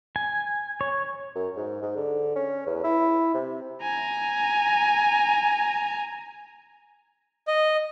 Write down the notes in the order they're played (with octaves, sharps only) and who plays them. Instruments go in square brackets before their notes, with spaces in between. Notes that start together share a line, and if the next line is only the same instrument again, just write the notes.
[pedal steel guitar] G#5
C#5
[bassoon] F#2
G#2
G#2
D3
C#4
E2
E4
C3
[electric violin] G#5 A#5
[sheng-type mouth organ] D#5